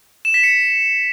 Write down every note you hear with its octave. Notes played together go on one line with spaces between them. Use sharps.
E7
B6
C#7